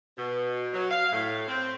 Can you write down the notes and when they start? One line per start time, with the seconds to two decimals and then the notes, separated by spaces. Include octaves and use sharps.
0.17 B2
0.73 F#3
0.91 F5
1.12 A2
1.48 C4